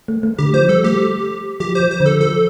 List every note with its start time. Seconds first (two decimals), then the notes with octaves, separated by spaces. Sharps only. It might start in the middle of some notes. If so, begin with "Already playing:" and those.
0.08 A3
0.23 A3
0.38 D3 G4
0.54 F3 C5
0.68 G3 A4
0.84 A3 G4
1.60 F3 G4
1.75 F3 C5
1.91 C5
2.00 D3
2.06 A4
2.21 F3 A4